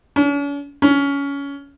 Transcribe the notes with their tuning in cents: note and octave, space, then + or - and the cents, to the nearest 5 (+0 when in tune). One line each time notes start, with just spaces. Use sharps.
C#4 +45
C#4 +20